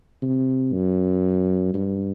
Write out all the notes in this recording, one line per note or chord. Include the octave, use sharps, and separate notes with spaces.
C3
F#2
G2